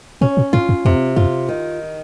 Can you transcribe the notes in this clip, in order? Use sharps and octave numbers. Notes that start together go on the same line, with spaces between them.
A#2 C#4
A#2
G#2 F4
F#2
F2 C3
F#2 F4
D#3